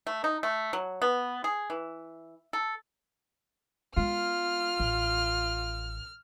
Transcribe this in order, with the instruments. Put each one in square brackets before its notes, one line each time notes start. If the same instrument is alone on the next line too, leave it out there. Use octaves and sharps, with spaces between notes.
[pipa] A3
D#4
A3
F#3
B3
G#4
E3
A4
[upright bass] G#3 B3 [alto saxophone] F4 [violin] F6
[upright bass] A1